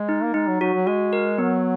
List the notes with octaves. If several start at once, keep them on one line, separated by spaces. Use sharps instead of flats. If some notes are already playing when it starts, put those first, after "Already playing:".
Already playing: G#3
D#4
A#3
G#3 D#4
F#3
F#3 F#4
F#3
G#3 F#4
A#4
F#3 B3